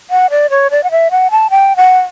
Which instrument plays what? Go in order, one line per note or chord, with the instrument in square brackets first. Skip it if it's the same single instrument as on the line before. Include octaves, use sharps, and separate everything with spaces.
[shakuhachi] F#5
D5
C#5
D5
F#5
E5
F#5
A5
G5
F#5